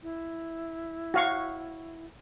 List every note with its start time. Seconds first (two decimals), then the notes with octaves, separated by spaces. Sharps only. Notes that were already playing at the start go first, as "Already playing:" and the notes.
0.03 E4
1.14 F#4 F5 C#6